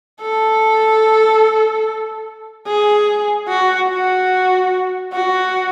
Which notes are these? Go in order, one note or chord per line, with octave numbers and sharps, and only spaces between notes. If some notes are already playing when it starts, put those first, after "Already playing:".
A4
G#4
F#4
F#4
F#4